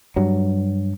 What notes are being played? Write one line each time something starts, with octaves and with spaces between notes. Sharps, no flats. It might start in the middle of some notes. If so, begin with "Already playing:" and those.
G2 F#3